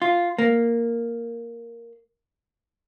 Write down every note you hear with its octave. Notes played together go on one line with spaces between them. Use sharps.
F4
A#3